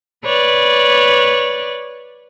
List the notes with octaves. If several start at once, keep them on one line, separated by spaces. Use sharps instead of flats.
B4 C#5 D5